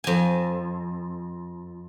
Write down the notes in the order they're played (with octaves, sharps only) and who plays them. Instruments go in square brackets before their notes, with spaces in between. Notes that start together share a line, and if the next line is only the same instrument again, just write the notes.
[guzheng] F2 G#5